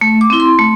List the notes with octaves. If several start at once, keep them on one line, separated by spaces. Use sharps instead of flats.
A3
D6
C4 E4
C6
A3